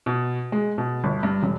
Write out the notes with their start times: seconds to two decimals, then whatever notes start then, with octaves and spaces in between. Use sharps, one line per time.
0.06 B2
0.52 G#3
0.78 B2
1.04 G1
1.23 G2
1.43 E1